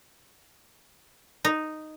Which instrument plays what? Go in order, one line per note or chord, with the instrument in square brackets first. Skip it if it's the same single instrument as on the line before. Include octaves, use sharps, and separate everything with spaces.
[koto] D#4